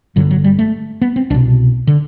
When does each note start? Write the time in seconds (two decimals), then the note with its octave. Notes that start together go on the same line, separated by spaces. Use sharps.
0.16 G1 G2 D3 F#3
0.31 F#3
0.44 G3
0.59 A3
1.01 B3
1.16 C4
1.30 C2 D4
1.34 B2
1.87 D3